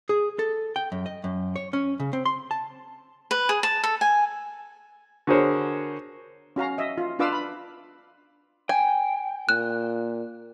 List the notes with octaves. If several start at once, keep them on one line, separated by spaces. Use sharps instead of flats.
G#4
A4
G5
F#2
D#5
F#2
C#5
C#4
C#3
C4
C6
A5
B4
G#4
A5
A4
G#5
D3 F#4 G#4 A#4 C5 C#5
C#4 F#4 F5 A#5
D#5 E5
F4
D4 F4 B4 F5 D6 E6
B5
G5 G#5
A#2 F#6